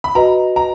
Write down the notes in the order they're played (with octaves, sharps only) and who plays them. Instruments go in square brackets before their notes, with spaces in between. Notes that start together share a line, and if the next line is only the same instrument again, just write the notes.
[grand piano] B5
[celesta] F#4 B4 D#5 [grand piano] A#5
[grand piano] A#5